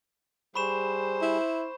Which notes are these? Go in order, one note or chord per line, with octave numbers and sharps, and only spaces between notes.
G3 G#4 C5 B5 C#6 E7
E4